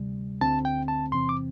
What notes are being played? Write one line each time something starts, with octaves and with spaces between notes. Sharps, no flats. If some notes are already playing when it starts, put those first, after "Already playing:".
Already playing: D2 C3 G3
D2 D3 C4 A5
G5
A5
E2 C3 E3 C4 C6
D6